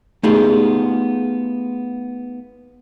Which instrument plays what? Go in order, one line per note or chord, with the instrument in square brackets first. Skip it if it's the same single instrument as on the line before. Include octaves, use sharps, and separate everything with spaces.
[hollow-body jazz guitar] A3 B3 D#4 F4 G4 G#4